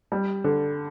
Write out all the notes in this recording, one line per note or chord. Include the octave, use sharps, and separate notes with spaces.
G3
D3